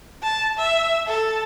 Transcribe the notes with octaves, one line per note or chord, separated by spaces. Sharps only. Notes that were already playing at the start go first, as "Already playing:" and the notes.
A5
E5
A4